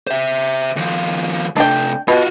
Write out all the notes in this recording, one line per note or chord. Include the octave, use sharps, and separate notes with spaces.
C5 E5
D#2 F3
C3 A3 D4 G5
B2 F4 F#4